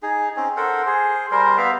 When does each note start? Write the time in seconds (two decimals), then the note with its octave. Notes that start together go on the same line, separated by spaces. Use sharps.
0.02 D#4 G#4
0.36 C4 C#4 D#4
0.56 A4 A#4 C5 F#5
0.86 G#4 C5
1.31 G3 A#4 C5
1.58 B3 E5 F5